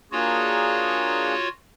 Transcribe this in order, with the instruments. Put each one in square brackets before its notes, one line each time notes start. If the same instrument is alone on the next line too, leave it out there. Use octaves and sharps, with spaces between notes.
[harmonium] A#3 D4 G#4 [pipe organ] F4 F#4 C#5